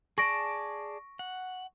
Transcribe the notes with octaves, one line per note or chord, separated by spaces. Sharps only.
G#4 D5 A5 C#6 A#6 D7
F#5